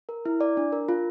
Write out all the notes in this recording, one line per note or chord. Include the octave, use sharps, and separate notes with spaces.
A#4
E4
D5
D4
A#4
F4